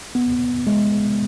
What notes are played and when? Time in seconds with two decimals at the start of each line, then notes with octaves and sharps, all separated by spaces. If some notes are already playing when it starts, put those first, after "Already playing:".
0.15 B3
0.67 G#3